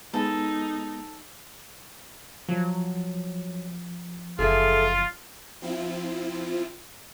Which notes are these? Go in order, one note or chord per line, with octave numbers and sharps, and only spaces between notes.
G#3 B3 D#4 A4
F3 F#3
F#1 F4 G#4 A4 E5
F3 C4 E4 F4